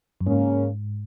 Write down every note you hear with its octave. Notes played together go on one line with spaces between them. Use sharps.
F#2
G#2 C#3 A#3 C#4